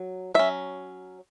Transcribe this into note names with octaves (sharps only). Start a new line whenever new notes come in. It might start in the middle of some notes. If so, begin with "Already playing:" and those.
Already playing: F#3
F#3 C#4 E5